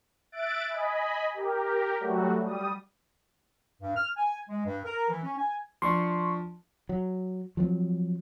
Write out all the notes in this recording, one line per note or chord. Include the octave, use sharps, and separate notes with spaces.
E5 F#6 A6 D7
D#5 G#5 B5
G4 A#4
F#3 G3 A3 F#4
G3 D#6
G2
F6
G#5
G#3
G2
A#4
E3
C#4
G#5
F3 D4 C6 C#6
F#3
F3 F#3 B3 C4